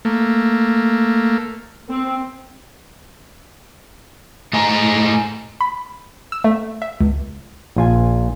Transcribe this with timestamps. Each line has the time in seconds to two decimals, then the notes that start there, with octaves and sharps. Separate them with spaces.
0.05 A3 A#3
1.90 C4
4.53 A2 D#5 G#5 A#5
5.61 B5
6.32 E6
6.44 A3
6.82 E5
7.01 C#2
7.76 A#1 F4 G#5